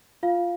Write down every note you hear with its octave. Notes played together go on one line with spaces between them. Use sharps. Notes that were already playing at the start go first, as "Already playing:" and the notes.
F4 F5